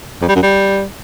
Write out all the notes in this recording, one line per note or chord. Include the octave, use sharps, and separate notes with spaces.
F2
G3
F#2
G3